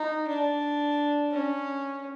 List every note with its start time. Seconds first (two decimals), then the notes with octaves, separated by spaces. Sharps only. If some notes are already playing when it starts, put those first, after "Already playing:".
Already playing: D#4
0.28 D4
1.31 C#4